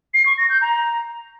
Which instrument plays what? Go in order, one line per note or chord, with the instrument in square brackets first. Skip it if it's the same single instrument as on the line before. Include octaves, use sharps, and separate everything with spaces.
[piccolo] C7
C#6
A#6
G6
A#5